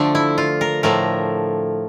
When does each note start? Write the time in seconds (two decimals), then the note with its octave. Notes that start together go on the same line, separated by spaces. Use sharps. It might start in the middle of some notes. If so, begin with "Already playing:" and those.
Already playing: D3 F3 A3 D4
0.15 E4
0.38 F4
0.61 A#4
0.83 A2 F3 A3 A#4